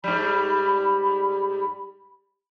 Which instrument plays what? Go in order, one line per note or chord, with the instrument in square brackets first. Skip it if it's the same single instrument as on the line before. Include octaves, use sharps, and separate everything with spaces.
[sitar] G#2 G3 [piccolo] B5